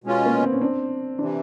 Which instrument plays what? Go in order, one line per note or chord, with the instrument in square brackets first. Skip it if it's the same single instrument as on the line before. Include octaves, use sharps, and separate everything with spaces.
[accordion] B2 G#3 C#4 F4
[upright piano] A#3
B3
C4
C#4
C4 D4
[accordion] C3 E3 [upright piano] C4 D4